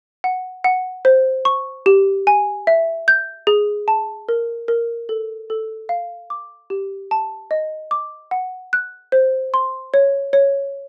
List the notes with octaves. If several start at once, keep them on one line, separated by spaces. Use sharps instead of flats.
F#5
F#5
C5
C#6
G4
G#5
E5
G6
G#4
A5
A#4
A#4
A4
A4
F5
D6
G4
A5
D#5
D6
F#5
F#6
C5
C6
C#5
C#5